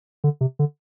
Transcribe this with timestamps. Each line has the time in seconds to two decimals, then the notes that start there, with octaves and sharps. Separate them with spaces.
0.24 D3
0.41 C3
0.59 D3